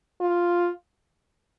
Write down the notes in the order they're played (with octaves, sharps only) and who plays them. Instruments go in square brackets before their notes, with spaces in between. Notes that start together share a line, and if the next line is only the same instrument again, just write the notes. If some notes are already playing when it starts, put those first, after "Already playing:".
[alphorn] F4